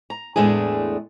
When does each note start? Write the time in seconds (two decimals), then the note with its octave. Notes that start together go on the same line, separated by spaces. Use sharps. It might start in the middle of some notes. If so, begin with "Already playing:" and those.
0.10 A#5
0.36 E2 A2 G#3 A3 D4 G#4